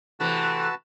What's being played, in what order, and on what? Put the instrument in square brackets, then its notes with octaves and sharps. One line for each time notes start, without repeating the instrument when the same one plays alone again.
[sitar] C3 E3 A3 [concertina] F#4 B4 A5